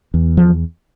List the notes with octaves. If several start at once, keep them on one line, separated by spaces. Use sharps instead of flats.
E2
F3